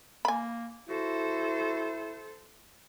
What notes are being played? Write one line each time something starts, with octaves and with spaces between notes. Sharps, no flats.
A#3 G#5 B5
E4 F#4 A4 C5